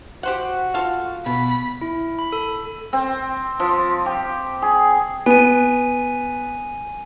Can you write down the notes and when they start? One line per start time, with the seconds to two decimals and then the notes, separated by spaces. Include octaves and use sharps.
0.23 F#4 G4 C5 F#5
0.74 F4 A4 F5
1.26 B2 B5
1.81 E4
2.19 B5
2.32 A4
2.93 C4
3.60 F3
4.06 G4
4.62 G#4
5.26 B3 G#5 D#7